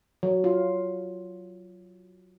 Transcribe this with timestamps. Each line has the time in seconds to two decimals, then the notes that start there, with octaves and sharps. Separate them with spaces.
0.23 F#3
0.44 F4